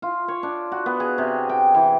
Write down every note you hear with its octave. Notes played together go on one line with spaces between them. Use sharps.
F4
C#5
D4
F#4
B3
G#4
C3
G5
E3